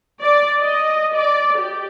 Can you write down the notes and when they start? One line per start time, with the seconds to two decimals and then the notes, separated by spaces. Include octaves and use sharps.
0.22 D5
0.62 D#5
1.15 D5
1.58 G4